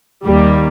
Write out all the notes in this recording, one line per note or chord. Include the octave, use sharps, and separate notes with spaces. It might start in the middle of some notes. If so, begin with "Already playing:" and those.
D#2 D#3 G3 A#3